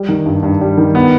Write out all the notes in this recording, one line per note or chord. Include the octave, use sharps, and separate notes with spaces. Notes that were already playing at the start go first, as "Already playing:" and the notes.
Already playing: G3
D#3
G2
G2
G3
D#3
B3